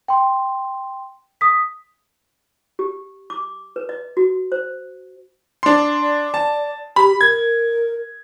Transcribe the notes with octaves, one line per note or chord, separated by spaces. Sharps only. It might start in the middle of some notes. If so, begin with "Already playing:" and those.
G5 C6
D#6 B6
G4
D6
B4
D#5
F#4
C5
D4 C6
D5
A5
G4 B5
A#4 G#6